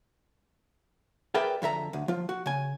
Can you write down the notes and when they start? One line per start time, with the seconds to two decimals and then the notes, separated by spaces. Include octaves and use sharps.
1.34 G#4 A#4 B4 D5 E5 G5
1.62 F2 D3 E5 A#5
1.93 D2
2.08 F3 F4
2.29 F#4
2.46 C#3 G#5